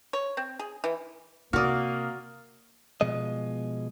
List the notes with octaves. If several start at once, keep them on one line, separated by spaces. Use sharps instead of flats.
C#5
C4
G#4
E3
C3 A#3 F#4 D5 D#6 F6
B2 F3 G#3 D#5